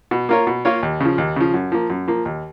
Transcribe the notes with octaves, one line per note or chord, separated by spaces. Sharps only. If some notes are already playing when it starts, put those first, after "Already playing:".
B2
A#3 F4 A#4 C#5
B2
A#3 F4 A#4 C#5
D#2
C#3 F3
D#2
C#3 F3
F#2
F3 A#3
F#2
F3 A#3
D#2